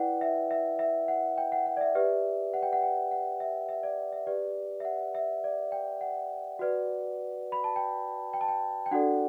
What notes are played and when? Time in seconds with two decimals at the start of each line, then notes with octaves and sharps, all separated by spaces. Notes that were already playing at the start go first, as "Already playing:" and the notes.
Already playing: E4 B4 D5 F#5 G5
0.21 E5
0.51 E5
0.79 E5
1.08 F#5
1.38 G5
1.52 F#5
1.66 F#5
1.77 D5
1.81 E5
1.95 G4 B4 D5 E5
2.54 F#5
2.62 G5
2.73 F#5
2.83 G5
3.11 F#5
3.40 E5
3.69 E5
3.83 D5
4.13 E5
4.27 G4 B4 D5
4.80 E5
4.85 F#5
5.15 E5
5.44 D5
5.72 G5
6.01 F#5
6.59 F#4 B4 D5
7.52 B5
7.64 A5
7.76 G5
8.33 G5
8.41 A5
8.48 G5
8.86 G5
8.91 D4 F#4 A4 D5 F#5